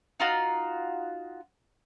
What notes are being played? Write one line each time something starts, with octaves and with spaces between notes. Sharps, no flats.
D#4 F4 F#4